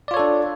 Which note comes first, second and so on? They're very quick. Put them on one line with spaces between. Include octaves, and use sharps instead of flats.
D5 F4 C#5 A4 D4